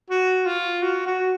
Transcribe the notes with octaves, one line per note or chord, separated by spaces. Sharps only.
F#4
F4
F#4
F#4